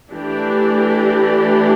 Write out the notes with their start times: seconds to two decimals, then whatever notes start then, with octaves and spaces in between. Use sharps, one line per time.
0.10 E3 A3 D4 G4